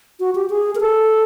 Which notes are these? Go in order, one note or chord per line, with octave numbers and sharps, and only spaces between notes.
F#4
G4
G#4
A#4
A4